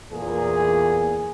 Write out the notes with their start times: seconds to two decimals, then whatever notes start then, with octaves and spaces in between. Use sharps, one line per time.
0.12 E2 A#2 G#4